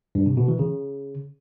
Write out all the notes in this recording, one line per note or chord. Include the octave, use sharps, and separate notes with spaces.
G2
C3
B2
E3
C#3